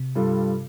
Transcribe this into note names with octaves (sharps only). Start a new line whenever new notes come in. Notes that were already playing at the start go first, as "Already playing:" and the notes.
Already playing: C3
G2 G3 F4 A4